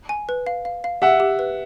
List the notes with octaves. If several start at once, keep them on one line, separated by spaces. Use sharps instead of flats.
G#5
B4
F5
F5
F5
G4 E5 F#5
G4
B4